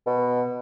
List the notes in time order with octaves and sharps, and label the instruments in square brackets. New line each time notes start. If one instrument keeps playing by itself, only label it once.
[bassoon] B2